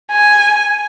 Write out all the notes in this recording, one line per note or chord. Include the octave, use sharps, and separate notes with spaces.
G#5